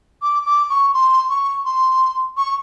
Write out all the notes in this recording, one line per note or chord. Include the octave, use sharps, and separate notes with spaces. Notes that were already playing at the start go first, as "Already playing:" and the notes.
D6
D6
C#6
C6
C#6
C6
C#6